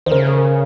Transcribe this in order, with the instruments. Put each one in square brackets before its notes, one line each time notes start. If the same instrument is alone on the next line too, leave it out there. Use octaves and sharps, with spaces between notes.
[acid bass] D#3 [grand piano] C5
[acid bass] C#3 [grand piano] A#4